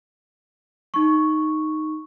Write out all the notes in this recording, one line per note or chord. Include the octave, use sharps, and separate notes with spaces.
D#4 C#6